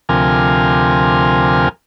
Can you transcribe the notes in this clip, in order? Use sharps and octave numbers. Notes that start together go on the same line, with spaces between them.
D2 C3 F3 A#4 G#5 F6